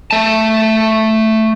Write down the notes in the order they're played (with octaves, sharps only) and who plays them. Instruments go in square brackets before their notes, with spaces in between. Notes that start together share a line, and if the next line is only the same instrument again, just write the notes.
[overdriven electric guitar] A3 A5